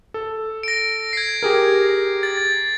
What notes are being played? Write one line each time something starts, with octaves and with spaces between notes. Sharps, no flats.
A4
A#6 D7
G#6 C7
G4 G#4 A#4
A6